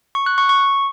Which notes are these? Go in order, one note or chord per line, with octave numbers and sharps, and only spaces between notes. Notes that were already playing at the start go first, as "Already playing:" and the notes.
C#6
F#6
C#6
C#6